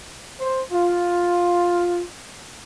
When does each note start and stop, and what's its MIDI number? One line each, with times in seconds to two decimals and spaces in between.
0.39 0.62 72
0.72 2.03 65